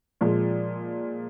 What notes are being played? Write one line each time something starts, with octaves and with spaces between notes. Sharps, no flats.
A#2 F3 G#3